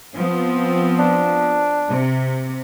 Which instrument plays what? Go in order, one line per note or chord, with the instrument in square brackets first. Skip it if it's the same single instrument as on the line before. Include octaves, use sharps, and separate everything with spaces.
[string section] F3 B3 C4
[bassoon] D4
[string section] C3